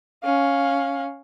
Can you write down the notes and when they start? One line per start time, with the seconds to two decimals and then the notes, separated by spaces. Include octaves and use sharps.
0.24 C#4 F5